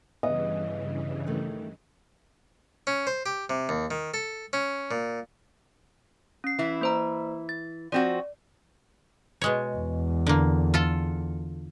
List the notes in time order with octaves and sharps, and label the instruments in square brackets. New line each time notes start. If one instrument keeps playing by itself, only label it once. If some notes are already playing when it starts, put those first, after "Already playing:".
[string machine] G2 C#3 E3 [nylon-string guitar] B3 [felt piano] D#5
[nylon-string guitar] D#3 A3
[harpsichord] C#4
C5
G4
C3
D#2
D#3
A4
C#4
A#2
[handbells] C#4 C7
[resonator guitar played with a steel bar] E3 E4
[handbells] A#3 C5 A#5
A6
[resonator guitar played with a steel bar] F3 C4 F#4 [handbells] D5
[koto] B2 G#3 C#5
[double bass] E2
[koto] D3 A#3
F4 A4